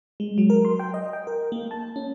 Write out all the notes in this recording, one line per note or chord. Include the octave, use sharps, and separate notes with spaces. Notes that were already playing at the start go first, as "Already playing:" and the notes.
G#3
F#3
A#4
C6
G5
D#5
G5
A#4
A#3
A5
C#4